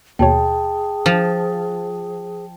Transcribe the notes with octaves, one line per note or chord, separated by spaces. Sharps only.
D#2 B2 G#4 C#5 G5 A5
F3